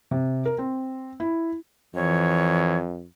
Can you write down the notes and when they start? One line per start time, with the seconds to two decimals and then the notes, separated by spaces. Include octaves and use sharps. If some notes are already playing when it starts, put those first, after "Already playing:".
0.11 C3
0.45 A#4
0.58 C4
1.20 E4
1.95 F2 E3 C#5